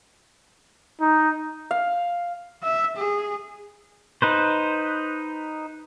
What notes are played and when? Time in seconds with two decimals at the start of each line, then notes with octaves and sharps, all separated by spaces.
1.01 D#4
1.71 F5
2.63 E5
2.97 G#4
4.22 D#4 B4 C5